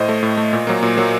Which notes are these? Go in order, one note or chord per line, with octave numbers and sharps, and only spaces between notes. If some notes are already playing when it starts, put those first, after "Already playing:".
Already playing: A2 C5 D#5
A3
A2
A3
A#2
F#3 A#3
A#2
F#3 A#3